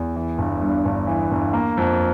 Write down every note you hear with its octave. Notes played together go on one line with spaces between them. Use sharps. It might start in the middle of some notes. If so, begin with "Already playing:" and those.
Already playing: E2
E3
G1
G2
G1
E3
G1
A#3
F2